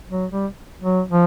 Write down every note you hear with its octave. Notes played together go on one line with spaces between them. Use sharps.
F#3
G3
F#3
F3